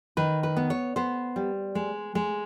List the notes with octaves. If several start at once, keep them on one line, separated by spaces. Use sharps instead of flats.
D#3 B4
B4
B3
C#5
B3 C5
G3
G#3
G#3